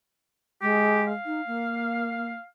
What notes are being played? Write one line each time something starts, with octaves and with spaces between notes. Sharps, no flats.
G#3 G4
F5
D#4
A#3